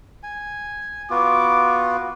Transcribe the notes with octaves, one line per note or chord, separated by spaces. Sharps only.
G#5
B3 F4 F#4 D6